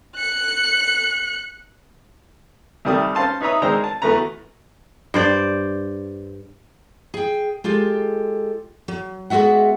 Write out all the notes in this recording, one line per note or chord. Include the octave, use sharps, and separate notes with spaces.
F#6 C#7
C2 D#3 G3 A3 D#6
C#4 C5 F5 A5 C6
D#4 B4 C#5 E5 A#5 D#6
D#3 G#3 D4 C5 A#5 E6
A5
E2 E3 A3 F#4 B4 A#5
G2 C5 D5
G#4 G5
G#3 F4 G4 A4
F#3
G#3 B3 F#4 E5 F#5